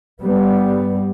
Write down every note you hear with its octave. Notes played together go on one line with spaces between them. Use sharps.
G2 G3 B3